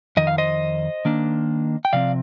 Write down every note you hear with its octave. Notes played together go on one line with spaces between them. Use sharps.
F2 D#3 D#5
F5
C5 D#5
D#3 A#3 D4
G5
C3 F3 C4 D5 F5